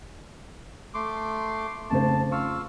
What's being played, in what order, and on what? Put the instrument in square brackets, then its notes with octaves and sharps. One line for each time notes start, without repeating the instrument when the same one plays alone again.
[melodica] A3 C6 D6
[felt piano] F1 C#3 C5 [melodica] A5
[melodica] F4 F5 E6 [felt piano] C#6